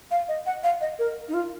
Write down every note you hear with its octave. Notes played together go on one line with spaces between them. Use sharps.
F5
D#5
F#5
F5
D#5
A#4
D#4
F4